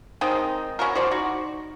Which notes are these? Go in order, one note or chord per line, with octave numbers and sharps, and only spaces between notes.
D#3 G#3 C4 D#4
C#4 E4 F#4 A#4
F#4 C5 D5
D#4 F#4